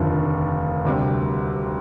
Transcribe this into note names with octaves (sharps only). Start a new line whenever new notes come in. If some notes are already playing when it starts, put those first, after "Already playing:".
Already playing: F1 D#2 D3 F3
D2 C3 G3